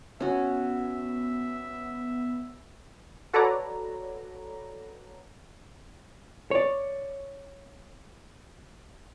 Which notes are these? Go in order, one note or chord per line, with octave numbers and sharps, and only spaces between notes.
B3 C#4 F#4 E5
F#4 A4 B4 C#5 D5 A#5
C#5 D5